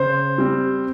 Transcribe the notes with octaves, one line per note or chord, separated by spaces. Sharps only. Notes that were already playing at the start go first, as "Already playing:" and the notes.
Already playing: C#3 C5
G3 C4